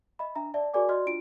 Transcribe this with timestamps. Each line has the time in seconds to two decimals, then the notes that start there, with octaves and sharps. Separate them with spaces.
0.19 D#5 E5 B5
0.35 D4 E5 A#5
0.54 D5 E5 A5
0.74 F#4 G#4 A#4 D5 G#5 D6
0.89 F#4 D5 D#5 C6 F6
1.06 D4 F4 D7